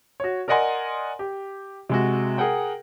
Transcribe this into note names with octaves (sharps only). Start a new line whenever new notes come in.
F#4 C#5
A#4 D5 D#5 F#5 G#5 C6
G4
C3 G#3 F#4
G#4 A#4 F#5 G5